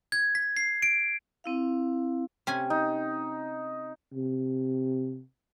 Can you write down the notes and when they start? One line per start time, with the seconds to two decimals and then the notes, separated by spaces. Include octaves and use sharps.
0.12 G#6
0.35 B6
0.57 C7
0.82 D7
1.44 C4 E4 F5
2.47 C3 C#4 G#5
2.70 D#4
4.14 C3